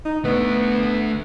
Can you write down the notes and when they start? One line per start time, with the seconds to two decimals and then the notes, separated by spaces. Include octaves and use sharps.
0.05 D#4
0.25 A3 B3 D4